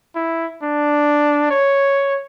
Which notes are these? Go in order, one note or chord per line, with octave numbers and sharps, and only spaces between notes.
E4
D4
C#5